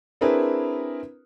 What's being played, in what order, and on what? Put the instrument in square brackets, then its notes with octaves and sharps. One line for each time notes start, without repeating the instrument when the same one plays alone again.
[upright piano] C4 D4 E4 G#4 A#4 B4